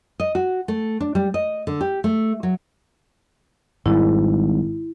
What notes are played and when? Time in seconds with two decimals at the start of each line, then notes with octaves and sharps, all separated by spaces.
0.20 D#5
0.35 F#4
0.68 A3
1.00 D4
1.15 G3
1.34 D#5
1.67 D3
1.81 G4
2.04 A3
2.43 F#3
3.86 G#1 G#2 G3 E4